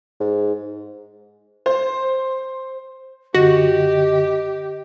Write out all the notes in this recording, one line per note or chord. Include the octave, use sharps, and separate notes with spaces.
G#2
C5
F#2 D3 F#4 G4 D#5